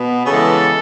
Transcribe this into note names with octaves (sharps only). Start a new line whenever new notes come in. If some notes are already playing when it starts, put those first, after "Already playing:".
Already playing: B2 B3
C#3 E3 G#3 B3 A4